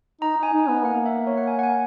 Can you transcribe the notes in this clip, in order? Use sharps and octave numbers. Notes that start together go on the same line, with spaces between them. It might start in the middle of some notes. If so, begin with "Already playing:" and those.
D#4 A#5
D#4
G#5
D#4
B3 G#5
A#3 F#5
E5
C#5
F#5
G#5
F#5
G#5